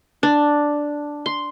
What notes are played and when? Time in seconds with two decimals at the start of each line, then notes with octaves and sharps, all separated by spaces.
0.23 D4
1.26 C6